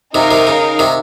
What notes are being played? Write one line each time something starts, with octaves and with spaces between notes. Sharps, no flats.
C3 D#3 D#4 A#4 F5
C3 D#3
C#3
C3 D#3